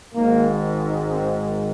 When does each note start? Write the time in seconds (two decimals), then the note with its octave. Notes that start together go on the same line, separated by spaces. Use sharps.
0.13 G#1 G#2 D#3 A#3
1.10 C4